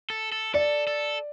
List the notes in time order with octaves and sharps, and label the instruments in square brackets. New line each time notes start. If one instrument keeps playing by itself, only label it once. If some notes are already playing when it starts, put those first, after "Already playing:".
[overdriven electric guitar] A4
A4
[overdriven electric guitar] A4 [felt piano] D5
[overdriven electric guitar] A4